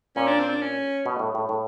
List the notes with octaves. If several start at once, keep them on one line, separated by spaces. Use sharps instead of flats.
A#2 C#4
D4
C4
D4
C#4
B2
A2
A2
A2